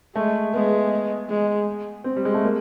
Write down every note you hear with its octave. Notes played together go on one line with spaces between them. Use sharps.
G#3 A3
G#3 B3
G#3
C4
G3
G#3
A3
A#3